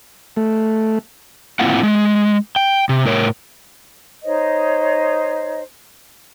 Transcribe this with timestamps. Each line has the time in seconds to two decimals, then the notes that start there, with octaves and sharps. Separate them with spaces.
0.37 A3
1.59 A2 A#3 C4 E4 F4 F#5
1.83 G#3
2.56 G5
2.89 C3
3.06 A2 A#4 C#5
4.24 D#4 C5 C#5 D#5